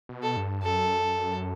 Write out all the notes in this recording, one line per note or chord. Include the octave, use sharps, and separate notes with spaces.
B2
A4
G2
F#2 A4